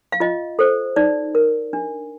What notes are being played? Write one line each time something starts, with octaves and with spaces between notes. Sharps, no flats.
F5
F4 D#5
A4 C5
D#4 D5
A#4
D4